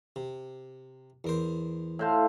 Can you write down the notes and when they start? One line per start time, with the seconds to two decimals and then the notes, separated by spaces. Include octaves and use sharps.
0.16 C3
1.24 E2 A#4 C5
1.99 A2 C5 F5